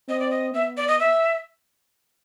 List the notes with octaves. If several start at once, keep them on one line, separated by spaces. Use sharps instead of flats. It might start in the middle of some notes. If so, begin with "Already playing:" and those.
C4 D#5
D5
D#5
B3 E5
D5
D#5
E5